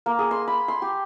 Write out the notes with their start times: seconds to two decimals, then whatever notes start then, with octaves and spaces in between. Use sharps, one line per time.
0.06 A#3
0.19 G#4
0.31 C6
0.47 B5
0.68 C6
0.82 G4